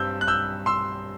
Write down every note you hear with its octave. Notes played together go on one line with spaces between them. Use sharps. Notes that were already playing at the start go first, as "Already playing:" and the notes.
Already playing: G2 G3 C4 E6 G6
F#6
E6 G6
C6 E6